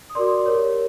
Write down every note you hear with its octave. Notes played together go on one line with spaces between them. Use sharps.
D#6
F#4 A#4 D5 C6 D6
G4 A#4 C#5